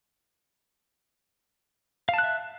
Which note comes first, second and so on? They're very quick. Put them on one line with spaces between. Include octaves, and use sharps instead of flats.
F5 A5 F#6 E5